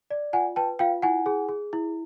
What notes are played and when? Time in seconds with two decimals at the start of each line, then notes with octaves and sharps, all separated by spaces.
0.11 D5
0.33 F4 F#5 G#5
0.56 B4 G5 A5
0.79 F4 F5 G5
1.02 E4 F#5 G#5
1.26 G#4
1.49 G#4
1.73 E4